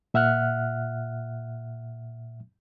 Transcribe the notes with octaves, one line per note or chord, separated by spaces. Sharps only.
A#2 E5 F#5 F6 F#6